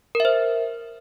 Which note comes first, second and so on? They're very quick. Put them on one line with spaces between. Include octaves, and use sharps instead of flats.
A#4 E5 C5